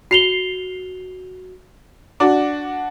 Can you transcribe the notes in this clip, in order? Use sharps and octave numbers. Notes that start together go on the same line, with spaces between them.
F#4 C7 F7 G7
D4 F#4 D6